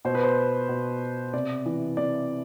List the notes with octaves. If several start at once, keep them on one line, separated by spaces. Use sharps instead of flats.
B2 C5
B4
C5
B2
C3 D5
E3
C3 D5